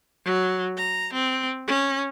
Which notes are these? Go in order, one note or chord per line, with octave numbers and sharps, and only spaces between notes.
F#3
A#5
C4
C#4